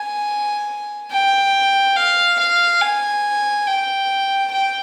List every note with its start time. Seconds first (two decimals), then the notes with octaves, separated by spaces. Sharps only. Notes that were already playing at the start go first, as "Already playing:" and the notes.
Already playing: G#5
1.12 G5
1.96 F5
2.39 F5
2.82 G#5
3.67 G5
4.51 G5